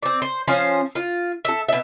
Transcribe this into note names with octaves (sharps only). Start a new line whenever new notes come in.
C4 D5
C5
F3 C#4 C5 F5
F4
A4 E5
B2 E5